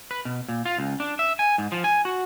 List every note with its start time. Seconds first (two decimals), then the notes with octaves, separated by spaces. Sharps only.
0.11 B4
0.25 B2
0.49 A#2
0.65 F4
0.78 C#2
1.00 D4
1.19 E5
1.39 G#5
1.58 G#2
1.72 F3
1.84 G#5
2.05 F#4